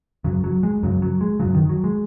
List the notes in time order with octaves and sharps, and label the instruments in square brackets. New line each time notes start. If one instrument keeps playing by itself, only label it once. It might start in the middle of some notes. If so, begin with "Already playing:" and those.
[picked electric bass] F#2 C#3 F#3
F#3
G#3
F#2 C#3 F#3
F#3
G#3
F#2 C#3 F#3
D#3
F#3
G#3